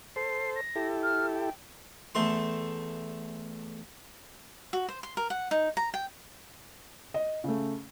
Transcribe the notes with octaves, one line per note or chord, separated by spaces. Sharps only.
A4 C5 C7
A#6
E4 G4 A4
F6
G5
E2 A3 C6
F#4
C5
C6
A#4
F#5
D#4
A#5
G5
D#5
C#3 A3